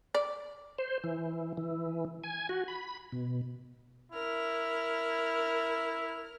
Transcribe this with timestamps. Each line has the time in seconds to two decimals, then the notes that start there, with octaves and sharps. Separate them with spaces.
0.15 D5
0.79 C5
1.04 E3
1.57 E3
2.24 G#5
2.49 F#4
2.68 B5
3.12 B2
4.12 E4 A#4 F6